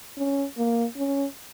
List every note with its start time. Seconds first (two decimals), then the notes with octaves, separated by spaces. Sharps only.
0.17 C#4
0.58 A#3
0.97 C#4